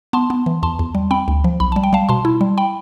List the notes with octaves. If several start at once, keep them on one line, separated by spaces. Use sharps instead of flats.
B3 A5 C6
B3
E3
E2 A5 C6
E2
G3
C4 G5 B5
D2
F3
B1 B5
G3 A5
G5
G3 F5 A5
B2 A5 C6
E4
G3
G5 B5